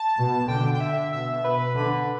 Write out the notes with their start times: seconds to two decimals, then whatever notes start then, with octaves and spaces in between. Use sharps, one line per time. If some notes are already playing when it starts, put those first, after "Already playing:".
Already playing: A5
0.17 B2
0.48 D3 G5
0.74 G5
0.80 E5
1.12 B2 E5
1.44 B4
1.77 D3 B4